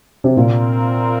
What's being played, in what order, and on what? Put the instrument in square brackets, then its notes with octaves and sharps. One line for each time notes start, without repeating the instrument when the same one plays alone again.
[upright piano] C3
[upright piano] A#2 [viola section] C4 F4 A#4